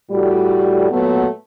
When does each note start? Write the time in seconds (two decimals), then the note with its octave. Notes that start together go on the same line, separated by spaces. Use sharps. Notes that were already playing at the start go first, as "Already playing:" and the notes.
0.10 A2 G3 F#4
0.91 A#2 F#3 A3 B3